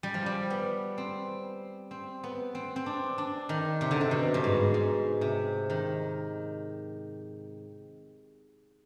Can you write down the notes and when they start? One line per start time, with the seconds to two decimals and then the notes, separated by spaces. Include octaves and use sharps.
0.03 G3
0.14 F3
0.26 G3
0.50 B3
0.98 C4
1.91 C4
2.24 B3
2.55 C4
2.76 C4
2.86 D4
3.18 D4
3.49 D#3
3.81 C3
3.91 D3
4.01 C3
4.11 B2
4.34 G2
4.44 G#2
4.74 G#2
5.21 C3
5.70 D#3